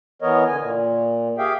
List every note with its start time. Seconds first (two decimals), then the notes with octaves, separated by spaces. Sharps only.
0.22 E3 B3 A#4 C#5 D#5
0.48 D3 G#5
0.60 A#2
1.38 G4 G#4 E5 F5 G5